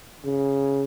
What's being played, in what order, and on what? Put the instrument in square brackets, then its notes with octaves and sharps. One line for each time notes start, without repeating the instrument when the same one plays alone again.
[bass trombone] C#3